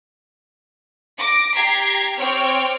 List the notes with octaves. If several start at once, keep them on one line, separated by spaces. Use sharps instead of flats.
D6 A#6 D7
G4 A#5 G#6 B6 C7
C4 C#5 G5 D6 F6